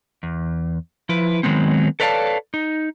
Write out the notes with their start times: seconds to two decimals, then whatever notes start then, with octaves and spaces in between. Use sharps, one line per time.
0.23 E2
1.09 F3 E4 B4
1.43 D#3 F#3 G#3 B3 C4
2.00 A4 B4 C#5 D5 F5 A5
2.54 D#4